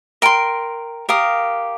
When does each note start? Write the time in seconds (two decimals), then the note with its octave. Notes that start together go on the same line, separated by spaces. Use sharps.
0.22 A#4 G5 C6
1.09 G4 A#4 F5 D#6